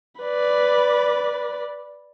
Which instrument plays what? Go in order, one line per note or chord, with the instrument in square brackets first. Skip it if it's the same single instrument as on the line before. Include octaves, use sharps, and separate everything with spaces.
[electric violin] B4 D5